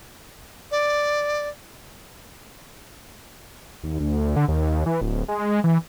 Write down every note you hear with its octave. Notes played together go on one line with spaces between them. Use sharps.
D5
D#2
D2
D3
D#2
E3
D1
G#3
E3